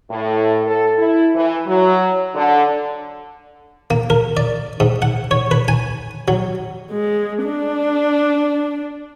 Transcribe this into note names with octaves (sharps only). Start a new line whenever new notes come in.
A2
A4
E4
E3
F#3
D3
A#3
A#4
D5
G#2
F#5
C#5
B4
G#5
F#3
G#3
D4